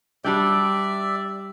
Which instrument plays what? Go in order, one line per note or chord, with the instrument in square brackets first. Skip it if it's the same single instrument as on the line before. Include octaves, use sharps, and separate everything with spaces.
[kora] G3 D4 G5 [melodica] D5 E5